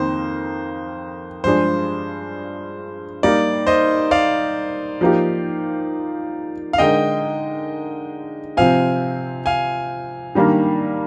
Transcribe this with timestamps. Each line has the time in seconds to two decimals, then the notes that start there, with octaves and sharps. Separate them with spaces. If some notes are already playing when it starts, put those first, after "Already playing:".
Already playing: F2 D#3 A#3 C5
1.44 G2 F3 G#3 D4 G#4 C5
3.23 G3 A#3 D#4 D5
3.67 C5 D#5
4.11 D5 F5
5.01 F3 A#3 D#4 G4
6.73 F5
6.78 D3 G#3 D#4 A#4 D#5 G5
8.57 C3 F3 C4 F5 G#5
9.46 F5 G#5
10.35 D#3 G3 A#3 D4